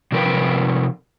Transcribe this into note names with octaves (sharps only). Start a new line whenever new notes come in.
C3 F3 A#4 B4 G5